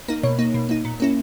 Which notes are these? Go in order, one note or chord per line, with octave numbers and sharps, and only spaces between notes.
A#3 D#4 A#4
B2 C#5
A#3 D#4
B2
A#3 D#4
A#2
A#3 C#4 E4